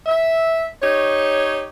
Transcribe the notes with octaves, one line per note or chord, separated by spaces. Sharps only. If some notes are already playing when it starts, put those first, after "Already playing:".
E5
D#4 G4 C#5